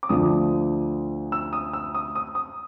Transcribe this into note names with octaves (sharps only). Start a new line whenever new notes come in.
D6
D2 D3 F3 D#6
E6
D#6
E6
D#6
D#6
D#6